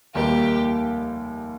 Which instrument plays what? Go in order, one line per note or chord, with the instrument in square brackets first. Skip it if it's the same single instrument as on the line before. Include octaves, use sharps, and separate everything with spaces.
[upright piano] F1 D#2 D#3 G3 A#3 [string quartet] G4